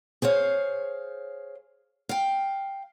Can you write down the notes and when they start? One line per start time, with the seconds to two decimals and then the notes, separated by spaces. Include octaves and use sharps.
0.22 G#4 C5 C#5 F5
2.09 F5 G5